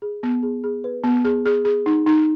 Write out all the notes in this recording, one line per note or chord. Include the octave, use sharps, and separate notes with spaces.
G#4
B3
G#4
G#4
B4
B3
G#4
G#4
G#4
D#4
D#4